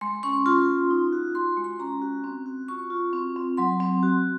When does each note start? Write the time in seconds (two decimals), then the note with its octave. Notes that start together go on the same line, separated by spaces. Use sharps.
0.01 G#3 C6
0.23 C#4 C#6
0.46 F4 C6
0.68 A#3
0.90 D#4
1.13 F#4
1.35 F4 C6
1.57 G#3
1.64 C6
1.79 C#4 A#5
2.02 F#4
2.24 C4
2.46 F#4
2.68 F4 C#6
2.90 F4
3.13 C4
3.36 C4
3.57 F#3 C6
3.80 C4
4.03 F#4